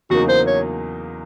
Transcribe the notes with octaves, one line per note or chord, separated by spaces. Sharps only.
E2 C#3 F#3 A#3 D#4 F#4
C5
C#5